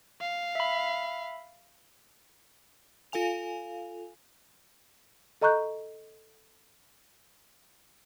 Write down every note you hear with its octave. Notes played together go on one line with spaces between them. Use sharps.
F5
E5 B5
F4 A4 F5 G#5 F7
A4 D#5 A#5 C#6 F#6 G6